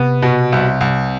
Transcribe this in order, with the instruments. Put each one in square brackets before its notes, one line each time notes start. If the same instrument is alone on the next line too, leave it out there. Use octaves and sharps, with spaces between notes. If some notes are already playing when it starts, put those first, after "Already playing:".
Already playing: [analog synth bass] C3 [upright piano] B3
[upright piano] B2
C2
C2